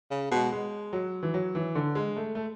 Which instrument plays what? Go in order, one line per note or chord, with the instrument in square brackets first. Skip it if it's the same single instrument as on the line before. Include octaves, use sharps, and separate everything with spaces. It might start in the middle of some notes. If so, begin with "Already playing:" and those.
[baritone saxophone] C#3
[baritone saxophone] B2 [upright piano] G#3
[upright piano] G#3
F#3
E3
F#3
E3
D3
G#3
A3
A3